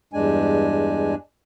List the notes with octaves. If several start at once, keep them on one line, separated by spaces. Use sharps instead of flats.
E2 G2 G#3 D4 G#5